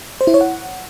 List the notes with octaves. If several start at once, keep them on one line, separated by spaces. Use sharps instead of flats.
C5
E4
C#5
F#5